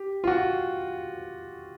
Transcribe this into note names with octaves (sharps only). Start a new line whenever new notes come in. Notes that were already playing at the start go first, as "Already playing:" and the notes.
Already playing: G4
F4
F#4